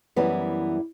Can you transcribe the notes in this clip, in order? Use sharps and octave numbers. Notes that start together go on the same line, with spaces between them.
F#2 E3 G3 B3 E4